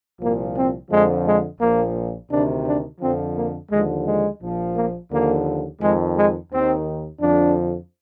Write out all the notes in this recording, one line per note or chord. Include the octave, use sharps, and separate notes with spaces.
C2 A#2 F3 A#3
C4
F2 D3 F3 G#3
G#3
A#1 A#2 F3 A#3
D2 C3 D#3 D4
D4
F2 D3 F3 C4
A#3
D#2 D3 F3 G#3
G#3
A#1 A#2 F3
A#3
D#2 D3 F3 A#3
F2 D#3 G#3
G#3
D#2 D#3 C4
F2 D3 F3 D4